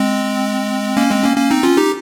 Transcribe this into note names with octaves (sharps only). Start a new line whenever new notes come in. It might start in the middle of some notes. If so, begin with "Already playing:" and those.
Already playing: G#3 C4
A#3 C#4
G#3 C4
A#3 C#4
A#3 C#4
C4 D#4
C#4 F4
D#4 G4